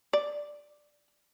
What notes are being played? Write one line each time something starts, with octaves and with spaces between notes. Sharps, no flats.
D5